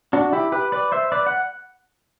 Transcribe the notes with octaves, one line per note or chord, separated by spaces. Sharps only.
D4 F#4
E4 G4
G4 B4
B4 D5
C5 E5
B4 D5
F#5